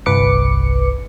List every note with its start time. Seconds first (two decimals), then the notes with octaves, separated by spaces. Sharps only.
0.06 G1 C2 B4 D6 C#7